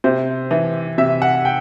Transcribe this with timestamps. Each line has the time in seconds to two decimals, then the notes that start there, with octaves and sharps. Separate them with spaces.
0.04 C3 C5
0.51 E3
0.98 C3 E5
1.22 F#5
1.45 G5